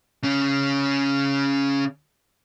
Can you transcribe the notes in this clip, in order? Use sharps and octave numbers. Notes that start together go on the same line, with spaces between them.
C#3 C#4